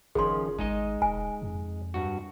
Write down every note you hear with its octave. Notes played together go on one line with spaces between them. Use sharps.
F#1 D#3 F3 C#4 G#4 C6
G#1 G#3 D#4 D#5
E1 G#5
F2
G2 F#4